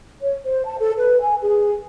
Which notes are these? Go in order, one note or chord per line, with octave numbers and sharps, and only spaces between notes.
C#5
C5
A5
A4
B4
G#5
G#4